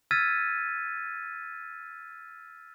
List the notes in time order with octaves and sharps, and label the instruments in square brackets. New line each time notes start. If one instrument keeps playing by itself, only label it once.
[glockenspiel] E6 F6 G#6 A6 B6 D#7